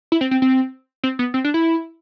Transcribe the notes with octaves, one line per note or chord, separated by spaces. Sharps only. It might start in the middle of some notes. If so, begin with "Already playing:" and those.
E4
C4
C4
C4
C4
B3
C4
D4
E4